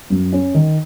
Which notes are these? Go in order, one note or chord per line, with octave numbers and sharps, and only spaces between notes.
F#2
C#4
D#3